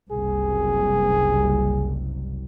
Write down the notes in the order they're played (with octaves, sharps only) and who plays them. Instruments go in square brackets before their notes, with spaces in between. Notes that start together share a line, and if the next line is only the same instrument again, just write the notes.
[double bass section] F#1 C2 [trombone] G#4